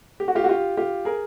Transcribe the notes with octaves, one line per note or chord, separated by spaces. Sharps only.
G4
F#4
F4 G4
F#4
F4 G4
F4 G4
G#4 A#4